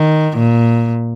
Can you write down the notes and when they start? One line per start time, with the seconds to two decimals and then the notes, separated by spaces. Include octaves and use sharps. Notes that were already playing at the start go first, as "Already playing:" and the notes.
Already playing: D#3
0.37 A#2